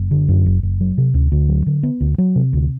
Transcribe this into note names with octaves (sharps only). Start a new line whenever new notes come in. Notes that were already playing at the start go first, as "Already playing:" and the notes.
Already playing: F#1
D3
F#2
F#1
F#1
F#3
C3
D2
D2
F#3
D3
B3
D2
F#3
C3
D2